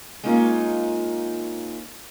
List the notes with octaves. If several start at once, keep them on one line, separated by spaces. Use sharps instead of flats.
G#3 A#3 C#4 D#4 F4